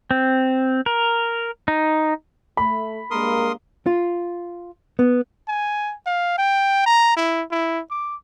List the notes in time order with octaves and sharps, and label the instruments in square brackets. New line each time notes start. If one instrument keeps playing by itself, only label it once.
[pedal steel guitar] C4
A#4
D#4
[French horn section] A3 [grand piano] B5
[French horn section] G2 G#3 A#3 [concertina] A#4 C6 D#6
[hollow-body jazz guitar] F4
B3
[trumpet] G#5
F5
G5
A#5
E4
E4
D6